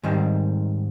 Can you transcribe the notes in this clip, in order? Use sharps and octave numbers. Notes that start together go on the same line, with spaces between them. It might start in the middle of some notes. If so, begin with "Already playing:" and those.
G#2 D#3 G3 C4